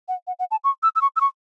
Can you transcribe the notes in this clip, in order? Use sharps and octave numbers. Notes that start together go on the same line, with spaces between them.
F#5
F#5
F#5
A5
C#6
E6
E6
C#6
E6
C#6